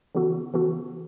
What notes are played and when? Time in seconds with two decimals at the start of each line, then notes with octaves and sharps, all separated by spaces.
0.15 C#3 E3 B3 F#4 A4
0.54 C#3 E3 B3 F#4 A4